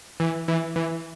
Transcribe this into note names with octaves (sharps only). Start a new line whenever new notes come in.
E3
E3
E3